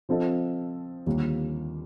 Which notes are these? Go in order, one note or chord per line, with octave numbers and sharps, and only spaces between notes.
F3 C4 F4 A4 D#5
D#2 D3 G3 A#3 F4